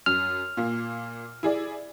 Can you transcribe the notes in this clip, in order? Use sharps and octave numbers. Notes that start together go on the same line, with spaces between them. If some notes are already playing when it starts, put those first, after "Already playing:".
F#2 F6
A#2 A#3
E4 G#4 D5